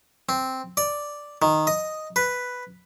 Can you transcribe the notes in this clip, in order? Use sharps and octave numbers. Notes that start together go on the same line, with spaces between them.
C4
D5
D#3
D#5
B4